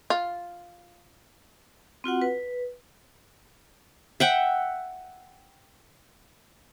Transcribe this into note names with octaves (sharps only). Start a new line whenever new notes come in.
F4
C4 F4 F#4 F#5
B4
E5 F#5 G5